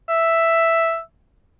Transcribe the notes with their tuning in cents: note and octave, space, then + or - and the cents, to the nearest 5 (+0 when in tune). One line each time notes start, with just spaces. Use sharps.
E5 +5